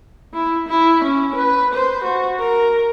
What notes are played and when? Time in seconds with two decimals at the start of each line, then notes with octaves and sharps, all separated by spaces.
0.33 E4
0.68 E4
1.04 C#4
1.35 B4
1.74 C5
2.04 F#4
2.39 A#4